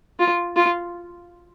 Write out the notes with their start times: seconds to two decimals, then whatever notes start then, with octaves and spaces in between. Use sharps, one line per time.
0.19 F4
0.56 F4